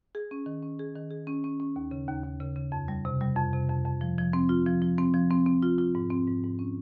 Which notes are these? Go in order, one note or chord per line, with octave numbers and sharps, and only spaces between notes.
G#4
C#4
D#3
C#4
G#4
D#3
G#4
C#4
C#4
C#4
D#2
C#3
D#2
D#2
C#3
C#3
F2
G3
C3
G3
F2
C3
F2
F2
F3
F3
C4
F4
F3
F3
C4
F3
C4
C4
F4
F4
G#2
C4
G#2
G#2
C#4